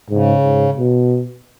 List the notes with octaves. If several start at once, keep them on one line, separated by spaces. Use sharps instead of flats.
G#2 C#3
G#2
B2